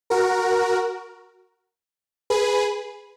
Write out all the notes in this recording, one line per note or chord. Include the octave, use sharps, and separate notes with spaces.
F#4 A#4
G#4 B4